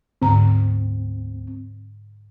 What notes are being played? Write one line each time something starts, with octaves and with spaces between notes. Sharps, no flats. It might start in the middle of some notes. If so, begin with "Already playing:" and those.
D2 G#2 D3 C4 A#5